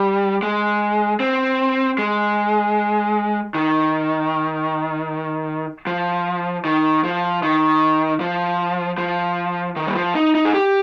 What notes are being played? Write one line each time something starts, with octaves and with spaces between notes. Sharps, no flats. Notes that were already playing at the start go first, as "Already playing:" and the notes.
Already playing: G3
G#3
C4
G#3
D#3
F3
D#3
F3
D#3
F3
F3
D#3
G3
F3
D#4
D#4
G#4
G4